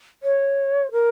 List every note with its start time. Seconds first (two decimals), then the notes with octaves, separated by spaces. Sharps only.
0.23 C#5
0.91 A#4